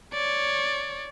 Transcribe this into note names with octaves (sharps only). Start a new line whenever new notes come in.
C#5 D5